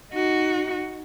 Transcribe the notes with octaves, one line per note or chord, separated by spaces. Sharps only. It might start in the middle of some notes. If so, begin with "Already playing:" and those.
D#4 F#4